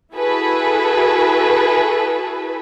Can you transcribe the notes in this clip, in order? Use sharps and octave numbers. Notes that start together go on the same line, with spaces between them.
E4 F#4 G#4 A4 B4